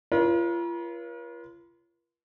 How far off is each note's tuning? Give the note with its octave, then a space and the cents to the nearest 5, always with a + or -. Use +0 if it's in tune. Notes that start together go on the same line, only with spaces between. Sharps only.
F4 -35 A#4 +45 C#5 +0